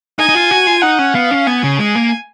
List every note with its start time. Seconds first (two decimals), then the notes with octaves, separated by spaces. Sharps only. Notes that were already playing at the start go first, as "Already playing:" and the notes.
0.18 D#4 G#5
0.29 D#4
0.35 F4
0.51 F#4
0.67 F4
0.82 D#4 F#5
0.99 C#4
1.15 B3 F5
1.31 C#4
1.47 B3 G#5
1.63 C#3
1.79 G#3 G#5
1.95 A#3